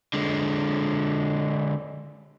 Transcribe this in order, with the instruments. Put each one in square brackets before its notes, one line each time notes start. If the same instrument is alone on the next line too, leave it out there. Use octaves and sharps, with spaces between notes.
[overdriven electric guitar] D3 G#3